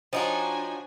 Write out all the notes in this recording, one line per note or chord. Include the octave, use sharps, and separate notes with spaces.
F3 D4 D#4 F#4 C5 C#5 G5 G#5